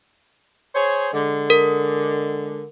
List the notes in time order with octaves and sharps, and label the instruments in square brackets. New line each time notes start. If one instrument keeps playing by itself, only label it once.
[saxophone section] G#4 C5 C#5
D3 G#3
[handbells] A#4